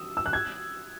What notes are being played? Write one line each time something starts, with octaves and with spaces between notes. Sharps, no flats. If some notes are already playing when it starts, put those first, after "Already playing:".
Already playing: D#6 E6
E6
F#6
G#6